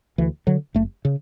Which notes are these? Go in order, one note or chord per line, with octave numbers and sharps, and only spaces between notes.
D2 E3
D3 F#3
F#1 A3
C#3